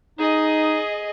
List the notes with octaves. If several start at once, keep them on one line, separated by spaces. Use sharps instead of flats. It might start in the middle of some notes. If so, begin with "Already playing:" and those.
D#4 G#4 D#5